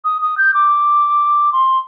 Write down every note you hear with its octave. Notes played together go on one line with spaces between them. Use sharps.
D#6
D#6
G6
D6
C6